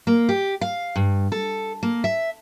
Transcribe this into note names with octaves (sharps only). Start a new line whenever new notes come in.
A#3
G4
F5
G2
A4
A#3
E5